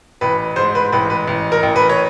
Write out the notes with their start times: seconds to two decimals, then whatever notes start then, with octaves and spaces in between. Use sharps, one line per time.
0.21 A1 B4
0.56 G#2 C5
0.75 B4
0.92 A1 B4
1.10 B4
1.28 A1
1.52 A#4
1.63 A1
1.76 B4
1.89 C#5